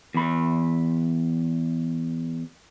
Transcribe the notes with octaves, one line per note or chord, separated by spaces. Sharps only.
E2 B5